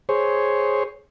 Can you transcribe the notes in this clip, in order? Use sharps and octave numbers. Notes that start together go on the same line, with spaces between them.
G#4 C5 C#5